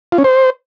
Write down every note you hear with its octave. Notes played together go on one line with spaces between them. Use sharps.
F4
C#4
C5